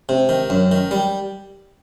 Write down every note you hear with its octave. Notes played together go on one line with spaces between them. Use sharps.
C3
D#3
F#2
D#3
G3